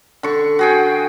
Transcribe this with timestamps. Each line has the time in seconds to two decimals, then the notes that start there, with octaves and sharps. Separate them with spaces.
0.23 D3 C#6
0.59 F#4 G#4 G5